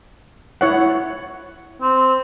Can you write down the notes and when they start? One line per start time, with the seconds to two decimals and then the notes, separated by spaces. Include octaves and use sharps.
0.61 E4 C#5 F#5
1.82 C4